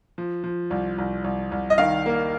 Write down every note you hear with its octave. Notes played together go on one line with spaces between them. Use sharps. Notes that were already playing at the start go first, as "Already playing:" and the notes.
F3
F3
C2
C2
C2
C2
D#5
D#3 F5
A#3